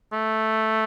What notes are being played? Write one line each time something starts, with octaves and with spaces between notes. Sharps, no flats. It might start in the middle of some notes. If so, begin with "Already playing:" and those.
A3